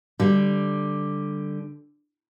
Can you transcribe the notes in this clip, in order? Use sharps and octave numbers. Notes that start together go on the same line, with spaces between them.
D3 G3